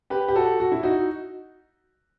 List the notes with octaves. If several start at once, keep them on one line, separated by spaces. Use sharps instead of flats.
G4 B4
G4
F#4 A4
F#4
E4
D#4 F#4